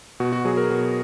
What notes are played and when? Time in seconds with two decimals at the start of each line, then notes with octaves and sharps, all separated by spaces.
0.20 B2 F#4
0.33 F#4
0.45 F#3 G#4
0.57 A#4
0.70 B2